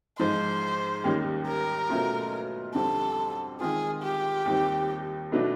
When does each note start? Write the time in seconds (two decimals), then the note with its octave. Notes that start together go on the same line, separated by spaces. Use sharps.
0.19 G#2 F3 G#3 C5
1.04 D#2 D#3 G3 A#3 C#4
1.47 A#4
1.90 B2 F#3 A3 C#4 F4
2.75 F2 D3 G3 C4 A4
3.61 D#3 G#3 C4 F4 G#4
4.03 G4
4.45 D#2 D#3 G3 C4
5.32 B2 F#3 A3 D4